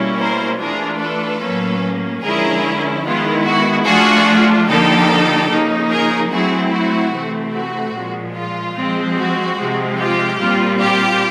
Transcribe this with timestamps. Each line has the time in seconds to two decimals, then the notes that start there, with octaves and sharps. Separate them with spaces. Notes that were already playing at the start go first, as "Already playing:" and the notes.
Already playing: B2 G3 A#3 C#4 E4
0.19 A#4 C5
0.60 E3 A3 D4 F4 G#4 A#4
1.00 A4 B4
1.41 A2 F#3 A#3 C#4
2.23 D3 F3 G#3 C#4 E4 G#4 A#4
3.04 D#3 G#3 B3 E4 F4
3.45 F#4
3.86 F3 A3 D4 F4 F#4 G#4
4.67 D3 F3 A#3 D#4 G4 A4
5.50 C#3 F3 A#3 D#4
5.90 G#4 A#4
6.31 F#3 A3 C4 E4 F#4 G#4
6.72 F#4
7.12 C3 E3 A3 C4
7.53 F#4
7.94 A#2 F3 G#3
8.35 F4
8.76 F3 G#3 C4
9.16 F#4
9.57 C3 F3 G#3 C4
9.98 F4 G4
10.39 A#2 G3 C4 F4
10.79 F4 G4